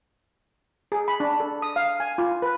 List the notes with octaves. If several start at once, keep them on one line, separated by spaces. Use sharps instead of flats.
G#4
B5
D4
A4
D#6
F5
G#5
F4
B4